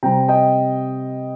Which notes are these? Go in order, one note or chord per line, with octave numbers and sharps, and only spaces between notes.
C3 G3 C4 G5 A#5
D#5 G5